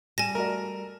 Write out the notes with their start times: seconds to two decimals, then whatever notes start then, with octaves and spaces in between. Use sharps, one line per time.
0.18 G3 G#5 A5 A#6
0.35 A3 F#4 A#4 D5